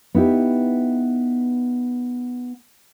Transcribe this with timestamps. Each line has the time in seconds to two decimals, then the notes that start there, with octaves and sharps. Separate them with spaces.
0.15 B3 D#4 E4 G4